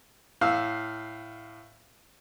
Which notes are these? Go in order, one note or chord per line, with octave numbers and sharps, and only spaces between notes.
A2 F5 E6